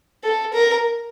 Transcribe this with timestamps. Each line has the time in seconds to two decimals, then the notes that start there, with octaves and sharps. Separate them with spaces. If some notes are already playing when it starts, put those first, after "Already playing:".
0.24 A4
0.53 A#4